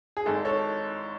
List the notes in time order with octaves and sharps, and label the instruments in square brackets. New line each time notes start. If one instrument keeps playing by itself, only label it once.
[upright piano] G#4
G#1 G#2 A4
A4 C#5